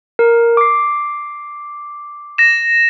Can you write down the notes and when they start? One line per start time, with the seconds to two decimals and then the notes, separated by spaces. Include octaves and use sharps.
0.19 A#4
0.57 D6 C7
2.38 A#6 E7